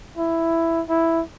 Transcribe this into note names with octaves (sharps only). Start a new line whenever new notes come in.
E4
E4